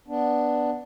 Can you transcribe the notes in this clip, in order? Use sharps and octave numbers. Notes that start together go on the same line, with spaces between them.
B3 D4